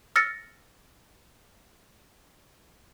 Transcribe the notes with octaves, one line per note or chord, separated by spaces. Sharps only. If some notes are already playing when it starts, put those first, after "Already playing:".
E6 F6 A6 A#6 C#7